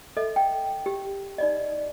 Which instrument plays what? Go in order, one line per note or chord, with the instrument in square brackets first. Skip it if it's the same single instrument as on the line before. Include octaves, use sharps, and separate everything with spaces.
[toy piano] A4 D#5 E5
G5
G4
D#4 D5 D#5